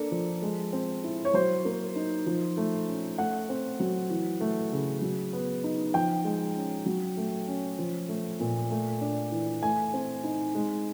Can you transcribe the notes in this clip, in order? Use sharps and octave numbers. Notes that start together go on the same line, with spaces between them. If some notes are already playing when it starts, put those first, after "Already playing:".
Already playing: A#3 D4 A4
F3
G#3
C4
E4
C#5
F#3 C5
A#3
D#4
F3
A3
C#4
A3 F#5
C4
F#3
E3
A3
C#3
F#3
B3
D#4
F3 G5
G#3
C#4
F#3
A3
C#4
F3
A3
A#2
A3
D4
E3
A3 G#5
C4
D#4
G#3